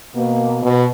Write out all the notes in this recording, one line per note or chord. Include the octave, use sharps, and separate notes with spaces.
B2 A#3
B2